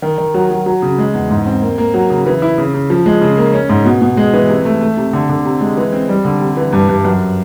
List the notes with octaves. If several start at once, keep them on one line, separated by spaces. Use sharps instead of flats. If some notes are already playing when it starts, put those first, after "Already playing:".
D#3
D#3
F#3
F#3
F#3
C#3
G#3
E2
G#2
C4
A#3
A#3
F#3
C#3
E3
E4
C#3
C#3
F3
G#3
C#3
A#3
C#4
G#2
B2
B2
G#3
E3
C3
A3
A3
C3
D3
D3
C3
G#3
E3
C4
G3
D3
C3
E3
G2
G2
F#2